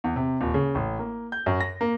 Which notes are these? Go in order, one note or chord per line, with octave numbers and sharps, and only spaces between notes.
E2
C3
D#1
C#3
A1
A#3
G6
F#2
A#6
A#3